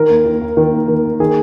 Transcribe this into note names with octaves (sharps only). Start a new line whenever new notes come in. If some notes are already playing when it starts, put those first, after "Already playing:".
Already playing: D#3 A#4
D#2
D#3
D#2
D#3
D#2
D#3
D#2
D#3 G#4